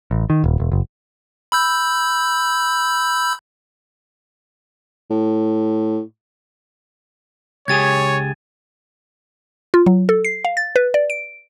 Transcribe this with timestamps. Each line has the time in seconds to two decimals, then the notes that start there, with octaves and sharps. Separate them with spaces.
0.11 A1
0.30 D#3
0.44 D#1
0.60 E1
0.72 F#1
1.52 B5 E6 G6
5.11 A2
7.68 C#2 G4 G#4 C#5 G#6 A6 D#7
9.74 F4
9.86 F#3
10.09 A4
10.25 C7
10.45 F5
10.57 A6
10.76 B4
10.94 D5
11.10 D7